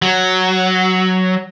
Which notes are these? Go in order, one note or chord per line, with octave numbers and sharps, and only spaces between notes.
F#3